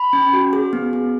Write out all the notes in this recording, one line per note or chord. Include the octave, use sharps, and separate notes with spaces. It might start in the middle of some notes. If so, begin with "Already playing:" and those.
Already playing: B5
C#4
F#4
G#4
B3
G#4